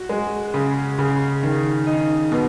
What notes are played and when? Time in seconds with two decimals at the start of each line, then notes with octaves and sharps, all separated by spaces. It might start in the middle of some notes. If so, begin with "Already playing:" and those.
Already playing: F#4
0.09 G#3
0.54 C#3
0.99 C#3
1.43 D#3
1.87 D#4
2.32 B2